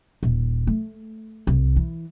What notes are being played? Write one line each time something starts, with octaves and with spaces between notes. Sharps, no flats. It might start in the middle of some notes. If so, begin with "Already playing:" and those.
D#1
A3
C2
E3